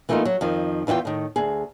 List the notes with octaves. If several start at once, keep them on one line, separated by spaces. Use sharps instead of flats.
E3 A3 A#3 D4 D#4 F4
F#3
F2 D#3 F3
E2 E3 E4 F4 G5
A2 D#3
D2 G#4